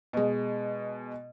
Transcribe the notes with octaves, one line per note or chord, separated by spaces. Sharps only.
B2 G#3